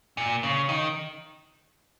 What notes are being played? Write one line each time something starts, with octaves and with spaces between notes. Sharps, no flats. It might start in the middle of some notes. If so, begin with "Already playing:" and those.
A#2
C#3
D#3